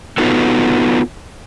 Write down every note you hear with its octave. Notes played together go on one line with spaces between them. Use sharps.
B3 D#4 F4 F#4 A4 B4